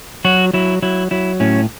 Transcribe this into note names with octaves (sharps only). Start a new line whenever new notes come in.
F#3 F#4
F#3 E4
F#3 E4
F#3 E4
A2 C#4